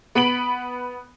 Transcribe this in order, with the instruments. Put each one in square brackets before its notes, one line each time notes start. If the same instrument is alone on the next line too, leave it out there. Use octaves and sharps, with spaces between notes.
[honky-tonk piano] B3 B5 D7 F#7